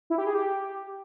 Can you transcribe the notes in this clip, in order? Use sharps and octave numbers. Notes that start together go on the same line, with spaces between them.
E4
G4
G#4
G4